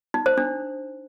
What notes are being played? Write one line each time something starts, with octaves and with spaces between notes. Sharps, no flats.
D#4
C5
D4